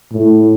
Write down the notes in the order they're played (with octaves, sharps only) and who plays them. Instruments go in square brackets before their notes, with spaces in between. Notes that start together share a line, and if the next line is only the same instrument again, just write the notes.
[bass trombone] A2